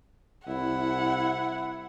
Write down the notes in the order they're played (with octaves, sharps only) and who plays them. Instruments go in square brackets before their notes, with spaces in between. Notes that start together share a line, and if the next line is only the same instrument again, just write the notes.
[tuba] C2 [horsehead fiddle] E4 [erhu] F#5